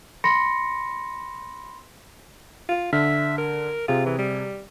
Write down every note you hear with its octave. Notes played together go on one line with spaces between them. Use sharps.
B5 C6 A#6 C#7
F4
D3 E5 F6
A#4
C3 F4 G#4
E3
G3